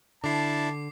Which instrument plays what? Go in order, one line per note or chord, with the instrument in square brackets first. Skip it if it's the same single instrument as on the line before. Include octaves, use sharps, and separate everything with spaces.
[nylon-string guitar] D3 [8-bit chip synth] D4 E4 [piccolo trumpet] A5 [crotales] D6 C7